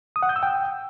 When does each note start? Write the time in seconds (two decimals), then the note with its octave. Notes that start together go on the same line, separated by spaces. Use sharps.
0.16 D#6
0.23 F#5
0.29 G6
0.36 E6
0.43 G5